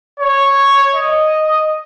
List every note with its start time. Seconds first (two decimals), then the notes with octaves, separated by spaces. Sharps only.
0.20 C#5
0.95 D#5